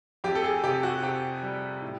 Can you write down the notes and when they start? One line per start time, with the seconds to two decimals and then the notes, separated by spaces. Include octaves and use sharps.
0.24 F2 G4
0.35 A4
0.44 G#4
0.63 C3 G4
0.83 F#4
1.03 C3 G4
1.43 G3
1.82 A2